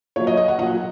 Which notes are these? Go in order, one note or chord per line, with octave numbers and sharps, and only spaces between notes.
A#2 F#3 C#5
D#5
D#5
F#5
A#2 F#3 F#5